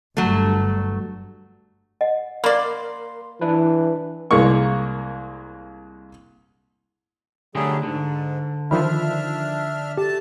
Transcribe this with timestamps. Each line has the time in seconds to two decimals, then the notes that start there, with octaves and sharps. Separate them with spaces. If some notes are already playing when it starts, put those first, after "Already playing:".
0.17 G1 G2 D3 F#3 A3
2.01 D#5 F#5
2.44 A#3 A#4 D5 B5 C6
3.41 E3 D4 E4 B4
4.31 C2 G#3 A#3 C#6
7.55 D3 F#3 G3 A3 G4 G#4
7.83 G#2 D3
8.71 D#3 F3 D4 E5 B5 F6
9.97 A3 G4 A5